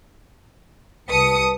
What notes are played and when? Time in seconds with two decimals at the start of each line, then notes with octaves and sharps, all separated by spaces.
1.09 C2 B4 A5 D#6 C#7